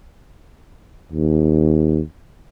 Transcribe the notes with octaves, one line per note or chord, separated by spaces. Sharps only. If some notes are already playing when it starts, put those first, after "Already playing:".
D#2